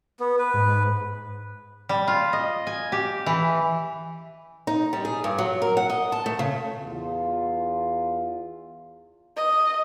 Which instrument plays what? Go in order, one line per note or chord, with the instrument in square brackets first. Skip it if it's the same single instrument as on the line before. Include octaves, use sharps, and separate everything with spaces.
[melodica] B3
B4
[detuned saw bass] G#2
[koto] G3
F4
D#5
G#5
G4
E3
[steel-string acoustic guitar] D#4
G3
G#4
G2
F#3
A#4
F#5
D#5
A5
A3
C#3
[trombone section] E2 F4
[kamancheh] D#5